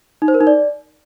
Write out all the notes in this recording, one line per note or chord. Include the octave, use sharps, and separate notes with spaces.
D#4
C5
A#4
D#4
D5